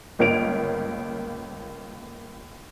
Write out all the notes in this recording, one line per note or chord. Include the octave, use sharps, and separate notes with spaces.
G1 C#2 A#3 C#5 D7 F7